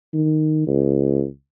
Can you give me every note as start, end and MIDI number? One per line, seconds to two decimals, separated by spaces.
0.14 0.66 51
0.67 1.25 37